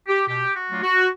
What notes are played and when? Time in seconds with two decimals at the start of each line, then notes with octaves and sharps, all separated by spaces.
0.08 G4
0.28 B2 G4
0.55 F#4
0.69 F#3 A3 D4 F4
0.83 F#4